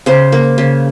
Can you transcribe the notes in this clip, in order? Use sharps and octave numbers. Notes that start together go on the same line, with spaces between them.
C#3 C5
A#3
C#3